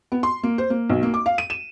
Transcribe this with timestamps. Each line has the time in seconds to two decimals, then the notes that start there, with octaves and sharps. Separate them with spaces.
0.12 B3
0.23 C6
0.43 A#3
0.58 C5
0.70 A#3
0.89 B1
1.03 A#3
1.14 D6
1.26 F5
1.38 D#7
1.50 E7